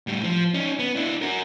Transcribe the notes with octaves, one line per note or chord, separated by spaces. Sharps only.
A2 G3
F3
C#4 D#4
B3
D4 E4
F#4 A#4